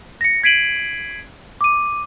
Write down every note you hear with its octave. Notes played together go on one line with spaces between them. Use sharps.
A#6 C#7
G#6 B6 C7 D7 D#7 F#7
D6 D#7